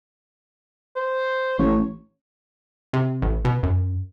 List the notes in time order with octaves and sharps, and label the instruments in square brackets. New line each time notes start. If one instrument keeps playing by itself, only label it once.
[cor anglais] C5
[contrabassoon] A1 [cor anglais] C#5
[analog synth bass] C3
A1
B2
F#2